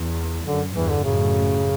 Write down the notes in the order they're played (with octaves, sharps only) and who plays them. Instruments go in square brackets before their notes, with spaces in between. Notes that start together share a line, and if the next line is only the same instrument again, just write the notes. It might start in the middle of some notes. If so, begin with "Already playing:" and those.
Already playing: [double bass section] E2
[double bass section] F#2 [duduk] D3
[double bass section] E2 G2 [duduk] E3
[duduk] D3
[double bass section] F#2 A2 [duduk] C#3